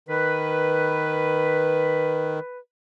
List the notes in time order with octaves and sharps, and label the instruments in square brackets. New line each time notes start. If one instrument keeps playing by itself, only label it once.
[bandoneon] D#3 [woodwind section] B4